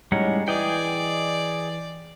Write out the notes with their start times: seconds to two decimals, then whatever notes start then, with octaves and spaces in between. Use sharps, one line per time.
0.12 A2 G3 G#3 C#4 D#4 F#5
0.48 E3 G#4 D5 D#5 G5